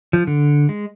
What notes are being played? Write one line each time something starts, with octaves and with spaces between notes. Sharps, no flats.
F3
D3
G#3